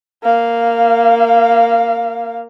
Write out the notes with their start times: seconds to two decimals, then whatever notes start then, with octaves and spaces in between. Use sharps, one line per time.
0.23 A#3 F5